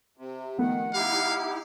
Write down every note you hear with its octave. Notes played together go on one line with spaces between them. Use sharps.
C3
D#3 F3 A3 B3 F#5
D#4 E4 G4 F5